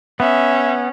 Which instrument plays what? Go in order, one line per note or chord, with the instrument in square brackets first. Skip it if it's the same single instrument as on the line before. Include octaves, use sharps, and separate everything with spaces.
[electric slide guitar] B3 [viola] C#4 [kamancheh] E5